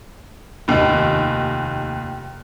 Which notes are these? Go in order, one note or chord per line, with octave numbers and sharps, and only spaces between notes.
F1 D#2